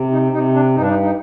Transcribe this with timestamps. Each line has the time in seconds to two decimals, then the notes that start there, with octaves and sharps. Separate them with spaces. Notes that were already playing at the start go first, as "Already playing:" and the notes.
Already playing: C3
0.12 D#4
0.32 C3 D#4
0.54 D4
0.75 G2 D#4
0.81 D4
0.90 D#4
1.03 D#4